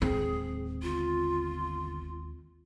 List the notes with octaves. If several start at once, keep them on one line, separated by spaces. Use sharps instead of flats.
D1 D#2 G#3 C4 G#4
G1 F4